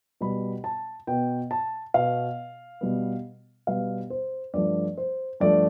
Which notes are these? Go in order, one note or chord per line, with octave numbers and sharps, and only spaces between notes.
B2 G3 B3 B5
A5
B2 B3 G5
A5
B2 B3 F5
B2 G3 B3
B2 G3 B3 F5
C5
G2 F3 A3 D5
C5
G2 F3 A3 D5